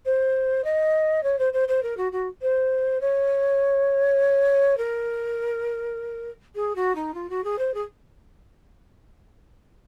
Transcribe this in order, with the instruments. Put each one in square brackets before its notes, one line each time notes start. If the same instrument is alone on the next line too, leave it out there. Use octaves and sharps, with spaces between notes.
[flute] C5
D#5
C#5
C5
C5
C5
A#4
F#4
F#4
C5
C#5
A#4
G#4
F#4
D#4
F4
F#4
G#4
C5
G#4